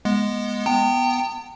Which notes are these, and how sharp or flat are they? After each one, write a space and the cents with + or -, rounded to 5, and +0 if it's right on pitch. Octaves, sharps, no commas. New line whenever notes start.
G#3 +0 B3 -20
B3 +0 G5 +0 A#5 -40